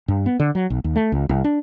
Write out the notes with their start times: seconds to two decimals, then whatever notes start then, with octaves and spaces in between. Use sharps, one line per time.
0.08 G2
0.26 B3
0.40 D3
0.55 F#3
0.70 B1
0.84 D#2
0.96 A3
1.12 C#2
1.29 C2
1.44 D4